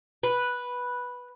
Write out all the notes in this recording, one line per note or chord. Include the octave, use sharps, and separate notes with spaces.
B4